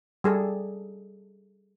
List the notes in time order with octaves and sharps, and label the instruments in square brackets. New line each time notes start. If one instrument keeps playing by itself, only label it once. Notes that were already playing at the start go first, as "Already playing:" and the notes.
[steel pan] G3 G#4 A4